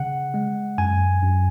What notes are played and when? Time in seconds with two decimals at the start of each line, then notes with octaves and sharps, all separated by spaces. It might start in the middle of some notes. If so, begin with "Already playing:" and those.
Already playing: C#3 F#5
0.34 G#3
0.78 F#2 G#5
1.22 F#2